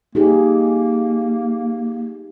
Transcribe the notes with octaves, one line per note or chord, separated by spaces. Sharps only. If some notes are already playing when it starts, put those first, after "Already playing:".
A#3 D#4 G4 G#4